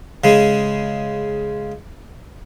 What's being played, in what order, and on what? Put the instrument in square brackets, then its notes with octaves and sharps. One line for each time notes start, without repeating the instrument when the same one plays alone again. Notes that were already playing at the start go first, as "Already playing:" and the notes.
[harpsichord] C#3 G#3